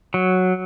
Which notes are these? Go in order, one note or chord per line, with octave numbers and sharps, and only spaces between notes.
F#3